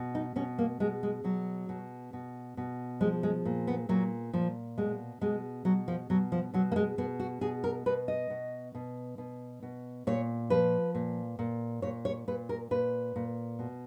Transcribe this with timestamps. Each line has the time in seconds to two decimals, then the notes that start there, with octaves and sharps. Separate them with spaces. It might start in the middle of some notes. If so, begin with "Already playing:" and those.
Already playing: B2
0.15 D#4
0.36 B2 C#4
0.58 A#3
0.80 B2 G#3
1.03 G#3
1.24 B2 F#3
1.69 B2
2.13 B2
2.57 B2
3.00 F3 G#3
3.23 G#3
3.45 A#2
3.67 B3
3.89 A#2 F#3
4.33 A#2 F3
4.78 B2 G#3
5.21 B2 G#3
5.65 B2 F#3
5.88 F3
6.10 B2 F#3
6.32 F3
6.54 B2 F#3
6.72 A#3
6.76 G#3
6.98 B2 B3
7.20 F#4
7.41 B2 G#4
7.64 A#4
7.86 B2 B4
8.08 D#5
8.30 B2
8.75 B2
9.18 B2
9.63 B2
10.07 A#2 C#5
10.50 F3 B4
10.95 A#2
11.39 A#2
11.82 A#2 C#5
12.05 C#5
12.28 A#2 B4
12.49 A#4
12.71 A#2 B4
13.16 A#2
13.59 B2